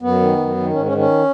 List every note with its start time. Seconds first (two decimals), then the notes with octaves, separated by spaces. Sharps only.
0.02 F#2 B3
0.20 D#3
0.38 F#2
0.56 D#3
0.73 G#2 C#4
0.85 C#4
0.92 D#3
0.97 C#4